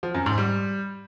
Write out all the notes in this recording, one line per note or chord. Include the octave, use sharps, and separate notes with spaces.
F3
F#2
G#2
G3